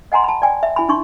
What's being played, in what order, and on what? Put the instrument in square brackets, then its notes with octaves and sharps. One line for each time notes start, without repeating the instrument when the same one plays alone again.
[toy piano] D#5 F#5 G#5 A#5 C6
A5 B5
D5 G5 G#5
E5
E4 G#5 B5
D4 D#4 C6 C#6